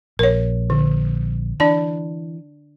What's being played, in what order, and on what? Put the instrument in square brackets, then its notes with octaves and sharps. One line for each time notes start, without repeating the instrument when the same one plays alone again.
[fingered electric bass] A#1 [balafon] A#4 C#5
[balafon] D3
[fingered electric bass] E3 [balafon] D4 D5 A5